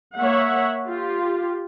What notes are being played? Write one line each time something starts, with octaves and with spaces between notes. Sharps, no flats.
A#3 C#5 E5 F#5
F4 G4